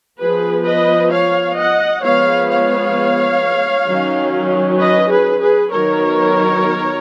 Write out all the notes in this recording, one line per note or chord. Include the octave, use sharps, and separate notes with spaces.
F3 B3 G#4 B4
B4 D#5
C#5 F5
D#5 F#5
F3 G#3 B3 C#5 F5
C#5 F5
D#3 F#3 C#4
B4 D#5
G#4 B4
G#4 B4
D#3 F#3 B3 A#4 C#5